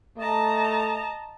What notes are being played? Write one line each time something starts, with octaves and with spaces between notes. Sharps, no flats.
A3 D#5 A5 A#5